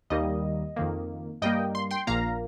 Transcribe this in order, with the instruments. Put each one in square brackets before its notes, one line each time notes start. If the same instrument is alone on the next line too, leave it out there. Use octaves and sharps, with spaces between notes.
[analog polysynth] D#2 D#3 G3 A#3 D#5
F2 D#3 A#3
G2 G3 A#3 D#5 G5
C6
G5 C6
A#1 A#2 A#3 F5 A#5